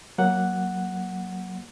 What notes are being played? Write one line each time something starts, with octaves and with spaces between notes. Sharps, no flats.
F#3 A#3 F#5